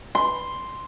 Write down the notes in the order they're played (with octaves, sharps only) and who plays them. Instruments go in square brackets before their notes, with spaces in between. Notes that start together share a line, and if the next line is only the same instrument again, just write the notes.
[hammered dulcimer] C6